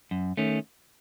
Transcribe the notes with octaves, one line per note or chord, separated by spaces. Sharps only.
F#2
D#3 A3 C#4